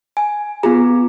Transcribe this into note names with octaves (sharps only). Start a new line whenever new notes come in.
G#5
B3 F4 G#4 A#5